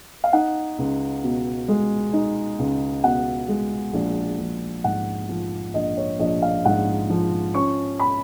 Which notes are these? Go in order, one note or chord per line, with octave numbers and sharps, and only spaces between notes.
F5
D#4 F#5
C#2
B2
G#3
D#4
C#2
B2 F#5
G#3
A#1
A#1
G#2 F#5
F3
A#1 D#5
C#5
A#1 D#5
F5
G#2 F#5
F3
C#4 C#6
B5